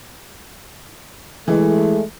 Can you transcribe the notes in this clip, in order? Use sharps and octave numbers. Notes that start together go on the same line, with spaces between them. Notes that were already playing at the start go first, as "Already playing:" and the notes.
E3 G#3 A3